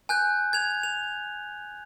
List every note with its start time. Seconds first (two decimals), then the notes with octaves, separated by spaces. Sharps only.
0.09 G#5 F#6 G6
0.53 G#6 F7
0.83 F7